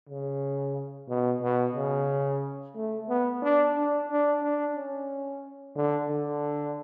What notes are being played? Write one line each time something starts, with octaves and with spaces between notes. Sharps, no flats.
C#3
B2
B2
C#3
A3
B3
D4
D4
D4
D4
C#4
D3
D3